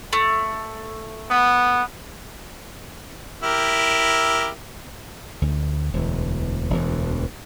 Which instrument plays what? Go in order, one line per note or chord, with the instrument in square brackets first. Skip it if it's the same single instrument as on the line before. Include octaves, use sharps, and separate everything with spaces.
[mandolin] A3
[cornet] B3
[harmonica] E4 G4 A#4
[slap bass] D2
E1 D2 E3
E1 D2 E3